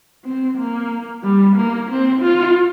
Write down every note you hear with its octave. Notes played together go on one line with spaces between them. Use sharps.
C4
A#3
G3
A#3
C4
F4